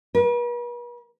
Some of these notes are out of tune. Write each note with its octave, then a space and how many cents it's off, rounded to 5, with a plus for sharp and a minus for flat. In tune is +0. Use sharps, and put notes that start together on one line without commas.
B4 -45